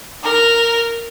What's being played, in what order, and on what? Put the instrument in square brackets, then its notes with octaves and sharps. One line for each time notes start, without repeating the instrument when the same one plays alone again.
[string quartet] A#4